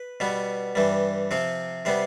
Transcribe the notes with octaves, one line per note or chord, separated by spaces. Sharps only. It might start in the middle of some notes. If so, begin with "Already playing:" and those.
Already playing: B4
B2 G3 B3
G2 E3 G3
C3 F3 C4
C3 G3 B3 C5